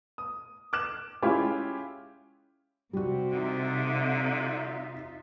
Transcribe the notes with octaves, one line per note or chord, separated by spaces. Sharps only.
D#6
D6 F#6 E7
G#3 C#4 E4 F4 G4
C3 G3 F#4
D3 D#4 F4 E5